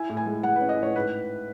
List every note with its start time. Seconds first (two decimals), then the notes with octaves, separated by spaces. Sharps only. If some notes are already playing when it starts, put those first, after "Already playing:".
Already playing: E4 G#5
0.09 A2
0.17 G#5
0.26 G#3
0.43 G#3 F#5
0.56 C#4 B4
0.69 D#5
0.78 A2 C#5
0.95 G#2 B4